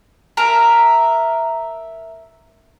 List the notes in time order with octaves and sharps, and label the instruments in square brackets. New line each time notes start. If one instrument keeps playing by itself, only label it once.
[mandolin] A#4 E5 A5 A#5